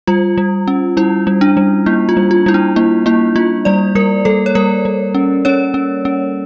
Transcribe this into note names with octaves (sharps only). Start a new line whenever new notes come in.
G3 F4
G3
C#4
G3 E4
G3
D4
G3
A#3 E4
F4
G3
F4
G3 E4
D4
A#3 E4
A#3 E4
A#3 F4
G3 D5
G3 A#4
G3 A4
C#5
G3 A#4
G3
C#4
C#4 C#5
C#4
C#4